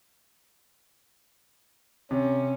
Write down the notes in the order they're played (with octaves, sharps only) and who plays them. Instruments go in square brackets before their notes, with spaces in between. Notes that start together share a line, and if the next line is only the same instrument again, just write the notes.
[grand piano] C3 [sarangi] C#4